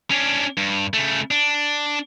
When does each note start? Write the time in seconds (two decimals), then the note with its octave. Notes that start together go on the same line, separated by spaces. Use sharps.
0.11 C#4 D4
0.57 G2
0.94 C#3 A3
1.31 D4